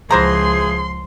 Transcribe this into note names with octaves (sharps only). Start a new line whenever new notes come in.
C#2 E3 F3 G#4 C5 A#5 C6